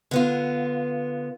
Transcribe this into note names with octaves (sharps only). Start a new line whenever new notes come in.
D3 B3 F4